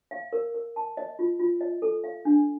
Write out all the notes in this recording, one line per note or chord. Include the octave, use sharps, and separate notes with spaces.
F5
A#4
A#4
A5
D#5
F4
F4
D#5
A4
F5
D4